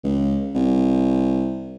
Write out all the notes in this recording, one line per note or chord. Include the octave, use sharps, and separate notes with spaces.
C#2
C2